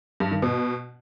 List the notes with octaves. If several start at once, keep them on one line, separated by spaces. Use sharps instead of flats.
G2
D#3
B2